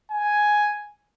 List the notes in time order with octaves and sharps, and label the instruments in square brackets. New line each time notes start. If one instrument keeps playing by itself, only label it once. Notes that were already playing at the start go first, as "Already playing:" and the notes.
[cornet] G#5